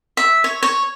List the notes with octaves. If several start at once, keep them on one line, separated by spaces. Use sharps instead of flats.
E5
C#5
C#5